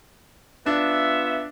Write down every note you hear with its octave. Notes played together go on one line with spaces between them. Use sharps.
B3 D4 F4 E5